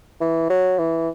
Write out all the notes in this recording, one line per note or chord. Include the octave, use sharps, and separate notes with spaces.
E3
F#3
E3